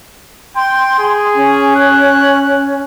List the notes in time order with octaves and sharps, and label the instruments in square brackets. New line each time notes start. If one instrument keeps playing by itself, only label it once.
[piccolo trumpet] G5 [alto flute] C6
[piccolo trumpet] G#4
[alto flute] C#4
[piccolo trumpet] F#6